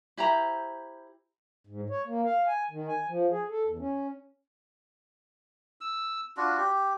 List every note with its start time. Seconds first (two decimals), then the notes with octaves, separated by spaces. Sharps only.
0.17 E4 G4 C5 A#5
1.67 G#2
1.90 C#5
2.06 A#3
2.25 F5
2.47 G#5
2.71 D#3
2.88 G#5
3.08 F3
3.30 G#4
3.49 A4
3.65 E2
3.79 C#4
5.81 E6
6.37 D4 F4 F#4
6.58 G4